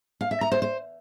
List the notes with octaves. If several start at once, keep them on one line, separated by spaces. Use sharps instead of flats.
F5
E5
A#5
C5
C5